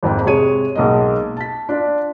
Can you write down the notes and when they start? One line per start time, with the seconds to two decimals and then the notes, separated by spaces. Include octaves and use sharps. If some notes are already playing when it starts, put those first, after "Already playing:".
0.03 G#1 F2 G#2 G5
0.25 C3 G#3 G#4 C#5 D#7
0.75 B1 G#3 A#3 D#5
1.37 A5 B6
1.69 D4 F4 D5